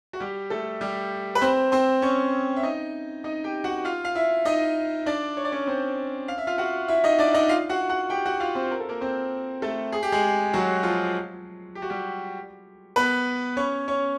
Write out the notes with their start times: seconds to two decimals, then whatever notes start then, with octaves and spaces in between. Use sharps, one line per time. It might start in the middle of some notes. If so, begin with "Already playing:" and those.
0.13 F#4
0.20 G3 G4
0.50 A3 A4
0.81 G3 G4
1.35 B4
1.42 C4 C5
1.72 C4 C5
2.02 C#4 C#5
2.56 E5
2.63 D#4 D#5
3.24 D#4 D#5
3.44 G4 G5
3.64 F#4 F#5
3.85 F4 F5
4.05 F5
4.15 E4 E5
4.45 D#4 D#5
5.06 D4 D5
5.37 C#5
5.44 D5
5.52 C#4 C#5
5.67 C4 C5
6.28 F5
6.38 E5
6.47 F4 F5
6.58 F#4 F#5
6.88 E4 E5
7.04 D#4 D#5
7.18 D4 D5
7.34 D#4 D#5
7.49 F4 F5
7.69 F#4 F#5
7.90 F#4 F#5
8.10 G4 G5
8.25 F#4 F#5
8.40 F4 F5
8.55 C4 C5
8.71 A#4
8.80 A4
8.89 A#3 A#4
9.01 C4 C5
9.62 A3 A4
9.93 G#4
10.03 G4
10.12 G#3 G#4
10.53 F#3 F#4
10.83 F3 F4
11.75 G4
11.82 F#4
11.90 G3 G4
12.96 B3 B4
13.57 C#4 C#5
13.88 C#4 C#5